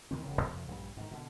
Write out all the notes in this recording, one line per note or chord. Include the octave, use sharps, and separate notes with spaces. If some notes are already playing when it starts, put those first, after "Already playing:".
D2 D#3 E3 C4
E1 C#3
F2 C3 F3
A#1 G2 C#3 G3
G#2 D#3
B2 D3